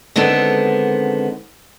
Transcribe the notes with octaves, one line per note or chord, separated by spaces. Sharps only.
D3 D#3 G#3 B3 C4 A4